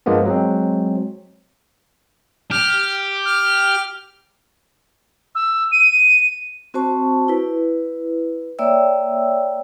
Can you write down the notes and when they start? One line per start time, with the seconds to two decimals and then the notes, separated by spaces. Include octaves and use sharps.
0.06 G2 F3 G#3 A#3 B3
0.26 F#3 G#3 C4
2.51 G4 F6
3.25 F6
5.35 E6
5.71 D#7
6.74 C4 F#4 C5 A5 C#6
7.28 E4 B4
8.59 A#3 C#5 D5 E5 G5 E6